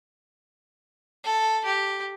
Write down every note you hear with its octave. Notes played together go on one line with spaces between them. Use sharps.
A4
G4